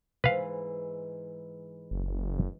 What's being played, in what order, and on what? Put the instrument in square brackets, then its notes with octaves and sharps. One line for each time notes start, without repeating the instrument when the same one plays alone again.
[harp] G#2 E3 [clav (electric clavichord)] B4 F5
[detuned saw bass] F#1